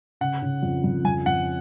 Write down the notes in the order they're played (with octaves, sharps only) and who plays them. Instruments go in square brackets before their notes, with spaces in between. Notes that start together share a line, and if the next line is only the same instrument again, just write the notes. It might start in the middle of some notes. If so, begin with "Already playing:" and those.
[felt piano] C#3 [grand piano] F#5
[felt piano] C#3
F2
F2
[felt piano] F2 [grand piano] G#5
[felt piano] F2 [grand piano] F#5